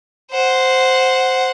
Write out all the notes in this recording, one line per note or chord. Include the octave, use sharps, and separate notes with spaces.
C5 F#5